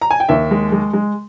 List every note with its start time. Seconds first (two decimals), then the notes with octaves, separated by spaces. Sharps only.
0.02 A#5
0.11 G#5
0.20 G5
0.29 D#2 E5
0.51 G#3
0.72 G#3
0.93 G#3